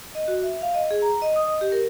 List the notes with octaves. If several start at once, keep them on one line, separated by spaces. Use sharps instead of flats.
D#5
F#4
E5
F5
D#5
G#4
A#5
D#5
D#6
D#5
G4
A#4